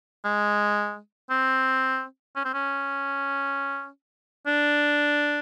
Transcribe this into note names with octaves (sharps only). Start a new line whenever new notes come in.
G#3
C4
C#4
C4
C#4
D4